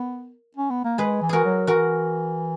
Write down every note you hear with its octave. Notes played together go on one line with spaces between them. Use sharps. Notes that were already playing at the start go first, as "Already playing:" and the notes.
Already playing: B3 A#4
C#4
B3
A#3
G#3 G#4 B4
E3
F#4 G#4 A#4
F#3
E3 F#4 A#4